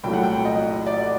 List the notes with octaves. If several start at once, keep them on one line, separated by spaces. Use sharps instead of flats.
C2 A#2 F#3 A3 G5
F#5
G5
D#5
D5